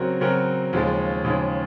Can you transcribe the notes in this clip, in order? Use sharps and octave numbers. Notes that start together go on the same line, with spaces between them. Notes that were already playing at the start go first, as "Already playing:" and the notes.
Already playing: C#3 F#3 C4 F#4 A#4
C#3 F#3 C4 F#4 A#4
D#2 C#3 F3 G#3
D#2 C#3 F3 G#3